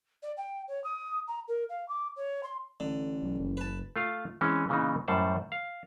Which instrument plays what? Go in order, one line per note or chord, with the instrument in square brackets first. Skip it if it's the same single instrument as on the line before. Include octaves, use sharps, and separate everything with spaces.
[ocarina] D5
G5
C#5
D#6
A#5
A#4
F5
D6
C#5
C6
[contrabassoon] A1 [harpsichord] D3
[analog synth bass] B1
F#1
[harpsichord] B4 A5
[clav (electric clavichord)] A3 F4 F5
E3 G#3 C4 C#4
A#2 C#3 E3 B3 D#4
F#2 A2 G3 C5 F#5 A5
F5